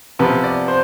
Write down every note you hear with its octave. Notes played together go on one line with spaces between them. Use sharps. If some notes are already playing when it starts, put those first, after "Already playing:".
C3 F3 B3 B4
D5
C5